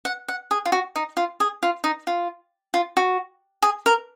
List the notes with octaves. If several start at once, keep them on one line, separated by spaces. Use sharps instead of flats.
F#5
F#5
G#4
F4
F#4
D#4
F4
G#4
F4
D#4
F4
F4
F#4
G#4
A#4